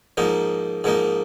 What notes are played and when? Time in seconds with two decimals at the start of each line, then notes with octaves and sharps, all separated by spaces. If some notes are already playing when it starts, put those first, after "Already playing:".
0.17 G#2 F3 A#3 D#4
0.84 G#2 F3 A#3 D#4